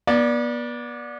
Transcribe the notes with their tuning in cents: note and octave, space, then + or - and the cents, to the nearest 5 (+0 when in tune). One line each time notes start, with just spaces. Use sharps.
B3 -35 D5 +0